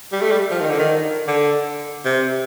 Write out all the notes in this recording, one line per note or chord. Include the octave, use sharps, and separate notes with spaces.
G3
A3
G3
F3
D#3
D3
D#3
D3
C3